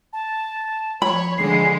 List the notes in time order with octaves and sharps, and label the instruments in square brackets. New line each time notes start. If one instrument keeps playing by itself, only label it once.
[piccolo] A5
[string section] F3 C#5 [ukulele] B5
[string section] D3 F3 G#3 [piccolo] C7